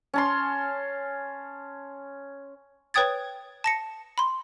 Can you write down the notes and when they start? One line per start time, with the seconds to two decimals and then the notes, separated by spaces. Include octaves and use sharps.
0.14 C#4 A5 C6
2.94 B4 C#5 G5 D#6 G#6 A6
3.64 A5 A#6 C#7
4.18 B5 C6